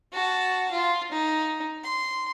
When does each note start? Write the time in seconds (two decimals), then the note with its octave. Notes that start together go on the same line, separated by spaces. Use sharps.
0.13 F#4 A5
0.71 F4
1.12 D#4
1.84 C6